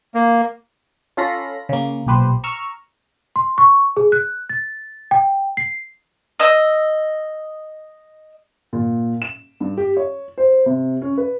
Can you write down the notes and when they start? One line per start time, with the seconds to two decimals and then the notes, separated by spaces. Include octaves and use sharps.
0.15 A#3
1.17 C#4 F4 A4 F5 B5 A#6
1.69 C#3 A#3
2.06 B1 A#2 G4 B4 C5
2.44 A#5 C#6 E6 F6
3.36 C6
3.58 C#6
3.97 G#4
4.12 F#6
4.49 A6
5.11 G5
5.57 C7
6.40 D#5 E6
8.73 A#2
9.22 E7
9.60 G2
9.77 G4
9.97 C#5
10.38 C5
10.66 C3
11.02 C#4
11.18 B4